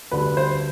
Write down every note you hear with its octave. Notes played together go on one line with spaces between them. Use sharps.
D2 D3 G3 B4
C5